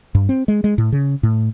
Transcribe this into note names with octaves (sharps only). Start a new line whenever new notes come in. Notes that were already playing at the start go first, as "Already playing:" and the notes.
G2
C4
G#3
G#3
A2
C#3
A2